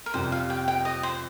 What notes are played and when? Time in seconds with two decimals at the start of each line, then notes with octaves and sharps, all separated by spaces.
0.06 A#4
0.14 F2 C3 G3 C5
0.32 F5
0.50 G5
0.68 G5
0.85 D#5
1.03 C5